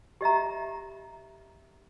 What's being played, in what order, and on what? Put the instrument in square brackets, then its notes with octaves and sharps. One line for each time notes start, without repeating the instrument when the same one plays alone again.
[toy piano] G4 D#5 E5 A#5